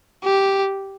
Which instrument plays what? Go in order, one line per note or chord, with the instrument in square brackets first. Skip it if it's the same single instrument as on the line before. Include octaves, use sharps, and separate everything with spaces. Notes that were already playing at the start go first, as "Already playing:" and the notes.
[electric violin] G4